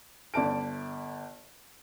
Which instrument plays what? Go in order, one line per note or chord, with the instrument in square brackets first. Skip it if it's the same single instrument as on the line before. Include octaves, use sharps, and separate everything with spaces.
[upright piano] G1 D5 A5 D7